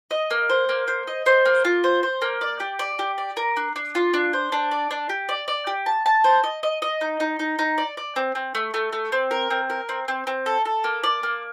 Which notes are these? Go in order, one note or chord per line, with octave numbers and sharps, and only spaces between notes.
D#5
A#3
C5
A#3
C5
D#5
C5
A#3
F4
C5
C5
A#3
D5
G4
D5
G4
D5
A#4
D4
D4
F4
D4
C5
D4
D5
D4
G4
D5
D5
G4
A5
A5
C5
D#5
D#5
D#5
D#4
D#4
D#4
D#4
D5
D5
C4
C4
A3
A3
A3
C4
A#4
C4
A#4
C4
C4
C4
A4
A4
A#3
D5
A#3